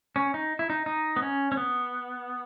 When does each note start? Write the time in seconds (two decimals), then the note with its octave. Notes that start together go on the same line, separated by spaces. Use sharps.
0.16 C#4
0.34 D#4
0.59 E4
0.70 D#4
0.86 D#4
1.16 B3
1.22 C#4
1.52 C#4
1.57 B3